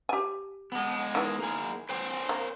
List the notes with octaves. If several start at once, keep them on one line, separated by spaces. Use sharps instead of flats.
G4 G#5
G#3 B3
D#3 E3
A#3 G#4
B4 C5 G5
A#3